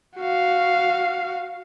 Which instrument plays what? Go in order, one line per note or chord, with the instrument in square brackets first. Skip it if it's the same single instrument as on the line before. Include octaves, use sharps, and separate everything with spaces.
[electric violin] F#4 F5